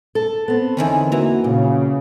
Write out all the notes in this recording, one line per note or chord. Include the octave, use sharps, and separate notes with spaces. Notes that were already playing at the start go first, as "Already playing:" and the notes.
A4
B3 C4
E2 D3 D#3 C#4
E3 A#3 F#4 B4 A#5
A#2 C#3